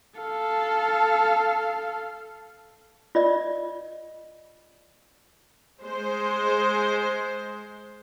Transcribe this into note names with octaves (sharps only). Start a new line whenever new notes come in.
A4 F5
F4 D5 D#5
G#3 C5